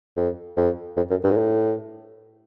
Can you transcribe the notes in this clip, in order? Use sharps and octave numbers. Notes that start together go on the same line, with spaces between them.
F2
F2
F2
F#2
G2
G#2
A2